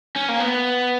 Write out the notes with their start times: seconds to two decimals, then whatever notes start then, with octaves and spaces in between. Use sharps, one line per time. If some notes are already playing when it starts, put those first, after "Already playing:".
0.16 C#4
0.29 A#3
0.40 B3